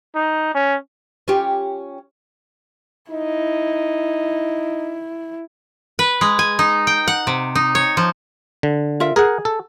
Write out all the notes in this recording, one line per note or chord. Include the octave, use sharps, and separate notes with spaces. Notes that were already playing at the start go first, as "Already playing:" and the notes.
D#4
C#4
C#4 F4 G4
D#4 E4
B4
G#3
G#5
D#4
G5
F#5
C3
D#4
C#5
F3
D3
F4 A#4 E5
G#4 A#4 F#5
A4